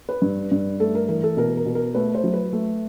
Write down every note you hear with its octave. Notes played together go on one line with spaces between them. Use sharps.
B4
G2
G2
A3 A4
A#4
E3 A#4
A4
B2 A#4
A#4
B2
A#4
A3 B4
C5
F#3
B4
A3